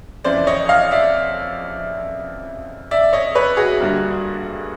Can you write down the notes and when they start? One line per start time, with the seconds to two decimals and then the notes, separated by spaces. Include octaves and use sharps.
0.24 F2 C#3 E3 C5 D5
0.47 C#5 D#5
0.69 D#5 F5
0.91 D5 E5
2.91 D5 E5
3.13 C#5 D#5
3.35 B4 C#5
3.57 F#4 G#4
3.80 G2 D3 G3 A#3